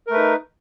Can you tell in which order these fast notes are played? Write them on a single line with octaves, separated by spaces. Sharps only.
A#4 A3 B4 D#4